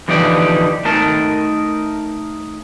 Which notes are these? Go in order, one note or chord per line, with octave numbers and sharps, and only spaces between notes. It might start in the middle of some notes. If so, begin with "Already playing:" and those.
D3 E3 F3 D#4 G4 D5
A3 D#4 A#4 A5